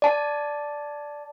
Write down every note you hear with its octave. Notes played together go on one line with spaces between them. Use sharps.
D5 A5